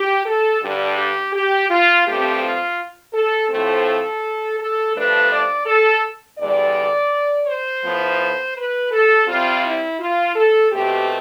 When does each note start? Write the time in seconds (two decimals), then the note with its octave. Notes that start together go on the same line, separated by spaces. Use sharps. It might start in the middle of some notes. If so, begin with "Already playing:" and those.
Already playing: G4
0.25 A4
0.61 G2 D3 G3 D4 G4
0.97 G4
1.33 G4
1.69 F4
2.06 G2 F3 A3 C4 G4
2.41 F4
3.13 A4
3.49 A2 F3 A3 C4 A4
4.59 A4
4.94 G2 F3 A3 D4 B4
5.30 D5
5.66 A4
6.38 E2 D3 G3 D5
7.47 C5
7.83 A2 F3 B3
8.55 B4
8.91 A4
9.28 C3 G3 C4 F4
9.64 E4
10.00 F4
10.35 A4
10.71 B2 A3 C4 G4